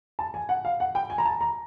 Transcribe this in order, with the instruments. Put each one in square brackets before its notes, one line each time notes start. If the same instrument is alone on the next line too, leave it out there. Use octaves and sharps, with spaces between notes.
[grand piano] A5
G#5
F#5
F5
F#5
G5
G#5
A#5
A5
A#5